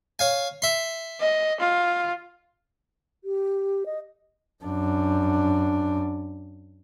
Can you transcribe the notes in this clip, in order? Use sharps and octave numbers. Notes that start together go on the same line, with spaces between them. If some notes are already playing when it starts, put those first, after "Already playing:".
C#5 F5 G#5
E5 C6
D#5
F4
G4
D#5
F#2 D4